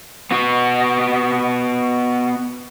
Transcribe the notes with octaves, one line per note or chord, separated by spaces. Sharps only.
B3 F#4